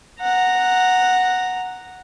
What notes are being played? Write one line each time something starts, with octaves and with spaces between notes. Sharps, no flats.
F#5 A#5